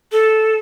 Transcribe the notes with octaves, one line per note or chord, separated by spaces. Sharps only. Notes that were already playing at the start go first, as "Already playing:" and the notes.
A4